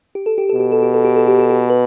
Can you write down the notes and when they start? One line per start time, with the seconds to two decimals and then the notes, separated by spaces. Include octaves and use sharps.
0.15 G4
0.26 A4
0.38 G4
0.49 B2 A4
0.60 G4
0.72 A4
0.83 G4
0.94 A4
1.05 G4
1.16 A4
1.27 G4
1.39 A4
1.50 G4
1.70 B4